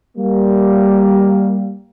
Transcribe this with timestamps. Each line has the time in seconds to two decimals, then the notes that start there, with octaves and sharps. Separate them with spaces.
0.17 G3 A#3